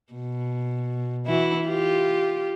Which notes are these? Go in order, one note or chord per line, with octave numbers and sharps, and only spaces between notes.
B2
E3 E4 F#4
F4 G4